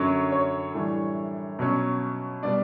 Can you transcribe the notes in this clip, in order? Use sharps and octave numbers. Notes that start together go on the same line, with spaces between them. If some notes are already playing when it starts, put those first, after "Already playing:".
Already playing: F#2 D3 F#3 C#4 C#5
C#5
A2 E3 G3 D4
B2 F#3 C#4
B2 G3 B3 D4 D5